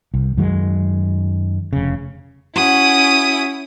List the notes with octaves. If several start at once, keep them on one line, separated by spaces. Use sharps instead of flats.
C2
F#2 D#3 F#3 G#3
F1 C#3
C#4 E4 F#4 D#6